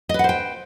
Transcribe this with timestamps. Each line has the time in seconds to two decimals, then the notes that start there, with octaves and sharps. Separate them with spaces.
0.09 D#5
0.14 B4
0.19 F#5
0.24 C5
0.29 G5